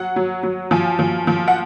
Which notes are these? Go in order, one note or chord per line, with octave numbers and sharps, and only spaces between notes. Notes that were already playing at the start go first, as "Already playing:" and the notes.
Already playing: F#3 F#5
F#3
F#3
F3 G#5
F3
F3
F#5